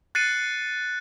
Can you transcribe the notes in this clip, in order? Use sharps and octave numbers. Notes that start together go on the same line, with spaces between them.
F#6 A6 C7 C#7 D#7